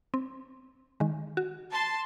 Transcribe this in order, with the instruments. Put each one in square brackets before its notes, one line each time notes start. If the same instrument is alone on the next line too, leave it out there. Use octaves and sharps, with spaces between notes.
[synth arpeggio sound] C4
D#3 G#3
F#4
[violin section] A5 C6